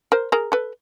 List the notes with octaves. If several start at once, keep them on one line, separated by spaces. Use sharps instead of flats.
A#4 C5
G#4 A#4
A4 B4